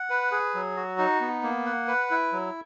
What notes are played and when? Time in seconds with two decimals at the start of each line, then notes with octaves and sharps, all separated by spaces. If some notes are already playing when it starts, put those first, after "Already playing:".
Already playing: F#5
0.10 B4
0.32 G#4
0.54 F#3
0.77 F#4
0.98 D#4
1.21 B3
1.43 A#3
1.66 F#5
1.88 B4
2.11 E4
2.32 F#3